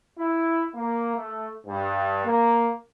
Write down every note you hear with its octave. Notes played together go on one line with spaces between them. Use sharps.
E4
A#3
A3
G2
A#3